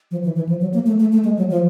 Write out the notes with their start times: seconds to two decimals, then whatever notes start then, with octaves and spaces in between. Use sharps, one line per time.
0.11 F3
0.24 E3
0.36 E3
0.49 F3
0.61 F#3
0.74 A#3
0.86 A3
1.00 A3
1.13 A3
1.24 G#3
1.37 F#3
1.50 F3